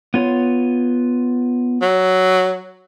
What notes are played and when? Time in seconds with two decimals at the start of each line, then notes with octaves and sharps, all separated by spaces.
0.14 B3 F4 C#5
1.82 F#3